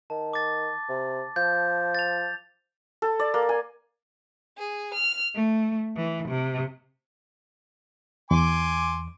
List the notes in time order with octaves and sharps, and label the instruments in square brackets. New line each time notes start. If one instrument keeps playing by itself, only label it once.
[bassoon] D#3 [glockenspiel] A5
[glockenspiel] D6 A6
[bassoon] C3
[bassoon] F3 [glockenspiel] G6
[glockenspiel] A6 F7
[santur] A4
D5
A#3
G#5
[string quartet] G#4
F6
A3
E3
C3
[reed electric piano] E2 [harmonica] G#5 C6 D6